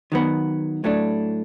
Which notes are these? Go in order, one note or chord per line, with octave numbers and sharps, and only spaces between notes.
D#3 F#3 B3
A2 F#3 A3 D4